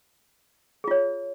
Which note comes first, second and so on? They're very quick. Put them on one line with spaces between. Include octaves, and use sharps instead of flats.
G#4 F4 C#5